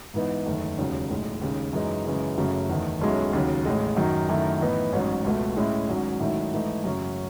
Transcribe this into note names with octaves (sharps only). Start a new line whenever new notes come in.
G#2 E3 B3 D#4
F#1 E2 D#3 A3
E1 D#2 C#3 F#3
B1 A2 G#3
D#2 C#3 G#3
F#2 E3 G#3 D#4
F#2 C#3 E3 G#3
F#1 F#2 C#3 F#3 A3
E2 D#3 A3
B1 B2 G#3 C#4 E4
D#2 C#3 F#3
A1 A2 G#3
F#2 D#3 F#3
F#2 D#3 A3 E4
A2 E3 B3 D#4
A1 G#2 F#3 C#4
C#2 B2 A3
A2 G#3 C#4 E4
G#1 G#2 F#3 C#4
G#2 D#3 F#3 A3 E4
G#2 E3 A3 D#4
F#2 C#3 F#3 C#4